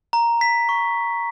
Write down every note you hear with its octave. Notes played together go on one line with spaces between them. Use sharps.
A#5
B6
C#6